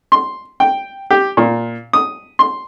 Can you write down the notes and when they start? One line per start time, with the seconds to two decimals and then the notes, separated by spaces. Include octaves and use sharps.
0.12 C6
0.60 G5
1.10 G4
1.37 A#2
1.93 D#6
2.39 C6